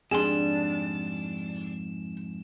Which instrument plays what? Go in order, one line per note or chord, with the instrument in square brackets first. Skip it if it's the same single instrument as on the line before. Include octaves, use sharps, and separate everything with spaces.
[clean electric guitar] F2 G#2 C6 [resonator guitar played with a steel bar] G3 D4 [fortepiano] G#4 [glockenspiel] E7